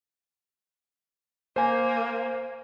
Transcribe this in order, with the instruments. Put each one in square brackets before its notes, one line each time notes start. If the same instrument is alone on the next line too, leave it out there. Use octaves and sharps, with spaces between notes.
[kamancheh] A#3 [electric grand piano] C5 G#5